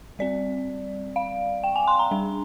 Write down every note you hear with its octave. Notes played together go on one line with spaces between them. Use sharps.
G3 C4 D5
F5
G5
G#5
C6
A#5
G3 D4